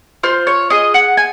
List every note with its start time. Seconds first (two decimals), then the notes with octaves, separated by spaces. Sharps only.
0.23 F4 C5
0.47 C#5
0.70 G#4 D#5
0.94 F#5
1.17 G#5